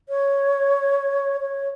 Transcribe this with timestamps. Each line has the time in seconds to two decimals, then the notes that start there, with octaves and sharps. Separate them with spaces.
0.09 C#5
1.41 C#5